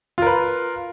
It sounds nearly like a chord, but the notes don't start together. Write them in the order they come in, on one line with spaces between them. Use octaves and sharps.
F4 A#4 B4